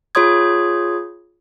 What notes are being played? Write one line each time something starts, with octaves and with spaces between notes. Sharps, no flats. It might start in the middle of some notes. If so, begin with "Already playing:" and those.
F4 G#4 C#5 C6 D#6 G#6